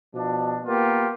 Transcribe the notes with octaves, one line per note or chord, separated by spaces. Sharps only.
B2 F3 D4
A#3 B3 F4 G4